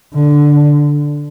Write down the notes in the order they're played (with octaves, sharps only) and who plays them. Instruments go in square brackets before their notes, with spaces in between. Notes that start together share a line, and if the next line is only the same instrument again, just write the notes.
[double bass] D3